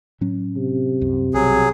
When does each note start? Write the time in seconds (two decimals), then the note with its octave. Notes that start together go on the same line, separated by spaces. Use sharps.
0.21 A2 F#3 C#4
0.57 C3
1.01 C2 F#2
1.34 B1 F#3 G3 G#4